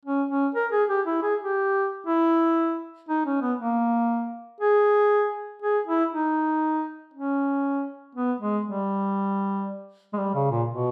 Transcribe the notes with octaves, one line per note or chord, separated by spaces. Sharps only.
C#4
C#4
A#4
G#4
G4
E4
G#4
G4
E4
D#4
C#4
B3
A#3
G#4
G#4
E4
D#4
C#4
B3
G#3
G3
G#3
G3
C#3
A#2
B2